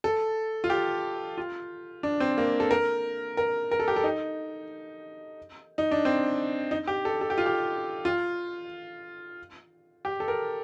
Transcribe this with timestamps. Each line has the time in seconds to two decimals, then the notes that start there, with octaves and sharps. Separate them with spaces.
0.04 A4
0.64 F4
0.70 G4
1.37 F4
2.03 D4
2.20 C4
2.38 A#3
2.60 A4
2.71 A#4
3.37 A#4
3.71 A#4
3.80 A4
3.88 G4
3.96 A4
4.04 D#4
5.78 D#4
5.91 D4
6.05 C4
6.71 D#4
6.87 G4
7.05 A4
7.21 A4
7.30 G4
7.38 F4
7.46 G4
8.05 F4
10.05 G4
10.20 A4
10.28 A#4